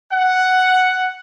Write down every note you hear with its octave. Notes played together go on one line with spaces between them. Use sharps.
F#5